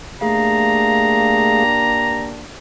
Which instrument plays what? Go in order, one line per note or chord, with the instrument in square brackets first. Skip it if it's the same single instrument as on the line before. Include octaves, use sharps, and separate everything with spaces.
[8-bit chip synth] A3 G#4 F5 [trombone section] A#3 D4 G4 [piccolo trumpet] A#5